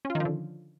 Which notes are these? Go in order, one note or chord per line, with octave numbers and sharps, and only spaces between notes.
C#4
F4
D#3
F3
D3